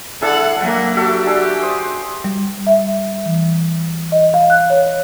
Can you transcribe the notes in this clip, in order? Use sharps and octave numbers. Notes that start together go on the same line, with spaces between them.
D4 E4 G#4 A4 F#5
F#3 A#3 F#5 A5
F#4 G4 A4 E5
D4 G#4
C5 D#6
G3
E5
E3
D#5
F5
F#6
C#5